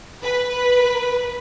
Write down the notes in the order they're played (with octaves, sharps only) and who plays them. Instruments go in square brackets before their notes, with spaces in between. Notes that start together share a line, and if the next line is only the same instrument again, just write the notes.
[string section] B4